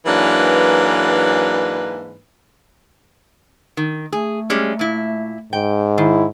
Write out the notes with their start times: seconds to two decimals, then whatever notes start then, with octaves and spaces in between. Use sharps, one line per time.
0.06 G#2 E3 F#3 A#3 D4 B4
3.77 D#3
4.12 A3 G#4
4.50 G3 G#3 C#4
4.79 A#2 E4
5.53 G#2 G5
5.98 D#3 E4